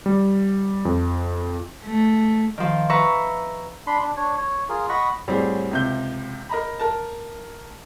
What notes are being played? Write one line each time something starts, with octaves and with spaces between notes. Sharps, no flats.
G3
F2
A3
D#3 F3
B4 E5 A#5 C#6
D4 B5 C6
D4
D4 C#5
C#5
F4 G#4 A#4
D#5 F#5 B5 C#6
A2 F#3 G3 C4 G#4
C#2 C3 G6
A#4 D#5 A#5 B5
A#4 A5